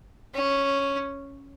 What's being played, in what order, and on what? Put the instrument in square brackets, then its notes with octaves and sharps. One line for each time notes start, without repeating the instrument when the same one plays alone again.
[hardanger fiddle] C#4